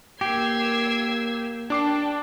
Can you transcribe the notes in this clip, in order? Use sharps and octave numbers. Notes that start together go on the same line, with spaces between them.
A#3 G4 E6 G#6 C7
D4 G5 A5 D6 C7